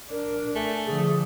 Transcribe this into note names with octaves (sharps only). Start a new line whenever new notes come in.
D4 A#4
A3 G#5
D3 F3 G#4